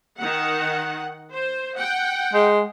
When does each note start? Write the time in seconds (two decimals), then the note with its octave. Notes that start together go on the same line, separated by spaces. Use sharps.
0.18 D#3 F#5
1.33 C5
1.78 F#5 G5
2.34 G#3